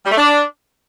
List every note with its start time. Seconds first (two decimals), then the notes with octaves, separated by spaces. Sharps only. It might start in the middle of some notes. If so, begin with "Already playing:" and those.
0.06 G3
0.12 A3
0.17 D4